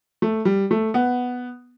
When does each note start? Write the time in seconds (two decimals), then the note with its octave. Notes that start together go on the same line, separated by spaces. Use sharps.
0.22 A3
0.45 G3
0.71 A3
0.94 B3